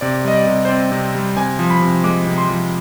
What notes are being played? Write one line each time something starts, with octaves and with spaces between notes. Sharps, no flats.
C3 D5
G3 D#5
D5
C3
C5
C4 D5
C3
G3
C3 G#5
F3
B5
C3
G#3 D6
C3
C6
F3